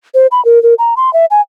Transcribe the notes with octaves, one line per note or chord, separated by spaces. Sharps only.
C5
B5
A#4
A#4
A#5
C6
E5
G#5